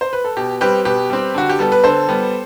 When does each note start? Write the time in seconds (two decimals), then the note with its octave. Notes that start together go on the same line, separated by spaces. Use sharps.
0.01 C5
0.13 B4
0.25 A4
0.37 B2 G4
0.61 G3 C4 G4 B4
0.85 B2 G4 B4
1.10 G3 C4
1.34 D3 F#4
1.49 G4
1.59 G3 B3 A4
1.72 B4
1.83 D3 A4 C5
2.08 G3 B3